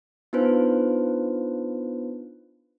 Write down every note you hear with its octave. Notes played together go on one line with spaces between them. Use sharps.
B3 D4 D#4 F4 B4 C5